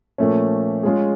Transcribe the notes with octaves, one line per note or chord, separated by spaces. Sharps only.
A#2 F3 A3 C#4
G#3 C#4 F4 G#4